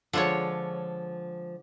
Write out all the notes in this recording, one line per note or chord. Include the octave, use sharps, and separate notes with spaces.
D3 F3 G#3 F4 C#5